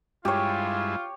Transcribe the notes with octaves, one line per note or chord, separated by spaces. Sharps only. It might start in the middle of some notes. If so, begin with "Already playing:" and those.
G2 G#3 E4 F4 G4 C#5